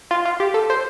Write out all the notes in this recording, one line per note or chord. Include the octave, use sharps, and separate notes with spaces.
F4
F4
G4
A4
C5